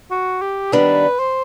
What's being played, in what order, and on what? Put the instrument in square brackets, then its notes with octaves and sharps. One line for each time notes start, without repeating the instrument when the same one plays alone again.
[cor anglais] F#4
G4
[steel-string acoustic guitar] D#3 G3 B3 D4 [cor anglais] B4
[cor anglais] C5